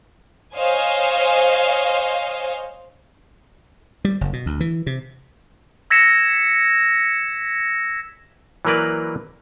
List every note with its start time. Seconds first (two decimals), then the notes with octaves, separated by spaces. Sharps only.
0.56 C5 C#5 D#5 F5 G#5
4.05 G3
4.21 F#1
4.33 B2
4.46 D2
4.60 E3
4.87 C3
5.90 E6 G#6 A#6 B6 C#7 E7
8.65 E3 F#3 A#3 A#4 B4 D5